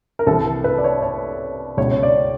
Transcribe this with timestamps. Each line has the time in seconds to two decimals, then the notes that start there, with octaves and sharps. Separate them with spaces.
0.19 A#4
0.27 C2 C3 E3 A4
0.64 B4
0.78 D5
0.84 C#5
1.02 C#5
1.77 C#2 B2 C#5
1.91 C#5
2.03 D5